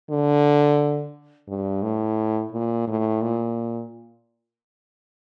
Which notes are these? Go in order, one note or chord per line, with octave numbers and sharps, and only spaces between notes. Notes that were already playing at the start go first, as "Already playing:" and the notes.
D3
G2
A2
A#2
A2
A#2